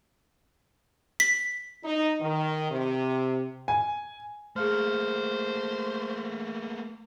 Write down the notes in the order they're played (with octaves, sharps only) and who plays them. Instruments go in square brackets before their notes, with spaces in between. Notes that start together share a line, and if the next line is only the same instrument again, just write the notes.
[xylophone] B6
[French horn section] D#4
D#3
C3
[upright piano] G#5
[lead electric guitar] A3 A#3 [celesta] G#4 F5 F6 [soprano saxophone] C5